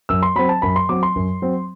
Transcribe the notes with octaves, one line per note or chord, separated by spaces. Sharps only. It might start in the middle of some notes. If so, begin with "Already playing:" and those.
F#2 E6
C6
F#3 C4 B5
A5
F#2 B5
C6
F#3 C4 D6
C6
F#2
F#3 C4